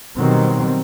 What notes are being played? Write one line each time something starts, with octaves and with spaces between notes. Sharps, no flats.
B2 D#3 F#3 G3 C4